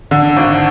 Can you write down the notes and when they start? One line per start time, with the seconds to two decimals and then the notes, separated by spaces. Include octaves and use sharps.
0.11 D3
0.37 G#1